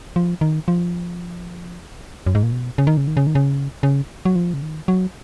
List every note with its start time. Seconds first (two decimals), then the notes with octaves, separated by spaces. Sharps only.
0.16 F3
0.41 D#3
0.68 F3
2.26 F#2
2.35 G#2
2.43 A#2
2.52 B2
2.78 C#3
2.87 D#3
2.97 C#3
3.07 D#3
3.17 C#3
3.27 D#3
3.35 C#3
3.83 C#3
4.25 F#3
4.35 F3
4.54 C#3
4.62 D#3
4.88 F#3